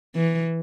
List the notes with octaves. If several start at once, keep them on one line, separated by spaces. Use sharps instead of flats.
E3